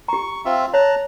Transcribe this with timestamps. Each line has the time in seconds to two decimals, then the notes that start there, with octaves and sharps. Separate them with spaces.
0.08 G4 A#5 C#6
0.45 C4 F4 E5
0.74 C#5 A5 A#5 F#6